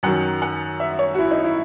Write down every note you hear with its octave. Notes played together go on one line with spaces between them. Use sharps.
F#2 D#3 F#3 F#5
F#5
E5
C#5
F#4
E4
D#4
E4